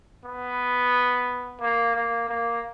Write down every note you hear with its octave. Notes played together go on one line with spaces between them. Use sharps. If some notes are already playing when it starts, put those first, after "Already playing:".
B3
A#3
A#3
A#3